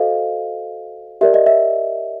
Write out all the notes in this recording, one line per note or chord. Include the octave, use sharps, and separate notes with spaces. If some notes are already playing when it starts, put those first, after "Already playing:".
Already playing: F#4 A4 C5 D#5 F5
G4 A#4 D5 E5
D#5
E5